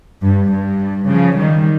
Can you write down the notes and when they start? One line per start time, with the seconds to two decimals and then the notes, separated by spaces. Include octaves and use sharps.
0.21 G2
0.50 G2
1.07 C#3 F3
1.37 D#3 G3